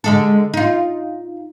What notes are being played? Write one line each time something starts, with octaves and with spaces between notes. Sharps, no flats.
D3 G#3 A4
D#4 F4